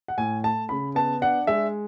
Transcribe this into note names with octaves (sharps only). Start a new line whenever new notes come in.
F#5
A2 G#5
A3 A5
C#3 B5
B3 A5
D4 F#5
G#3 E5